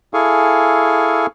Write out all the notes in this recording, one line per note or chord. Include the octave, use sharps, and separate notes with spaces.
E4 G#4 A4 F5 G#5 C#6